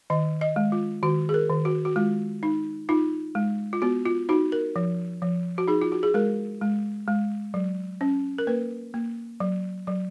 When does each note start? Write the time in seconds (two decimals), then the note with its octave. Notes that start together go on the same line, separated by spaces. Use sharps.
0.10 D#3 D#5
0.41 D#5
0.56 G#3
0.72 F4
1.03 D#3 F#4
1.29 G#4
1.34 A#4
1.50 D#3
1.65 F#4
1.85 F#4
1.96 G#3 F4
2.43 D#4
2.89 D#4 F4
3.35 G#3
3.73 F4
3.82 B3 F#4
4.06 F4
4.29 D#4 F#4
4.52 A#4
4.76 F3
5.22 F3
5.58 F#4
5.68 D#4 G#4
5.82 F4
5.92 F#4
6.03 G#4
6.14 G#3 A#4
6.61 G#3
7.08 G#3
7.54 F#3
8.01 C#4
8.38 A#4
8.47 A#3 B4
8.94 A#3
9.40 F#3
9.87 F#3